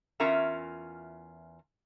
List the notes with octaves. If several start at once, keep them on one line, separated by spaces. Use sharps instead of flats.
E2 C#4 F4 A#4 E5 A#5